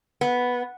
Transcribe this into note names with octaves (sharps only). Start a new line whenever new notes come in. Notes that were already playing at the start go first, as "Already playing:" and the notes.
B3